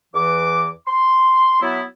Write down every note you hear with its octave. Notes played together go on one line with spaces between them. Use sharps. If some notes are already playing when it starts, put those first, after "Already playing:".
E2 E3 D6
C6
F#3 B3 E4